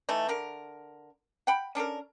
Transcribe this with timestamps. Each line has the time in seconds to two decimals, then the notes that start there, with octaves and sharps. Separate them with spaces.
0.09 E3 A3 D#4
0.29 D3 A#4
1.47 F#5 G5 B5
1.75 C#4 D4 A4 A#4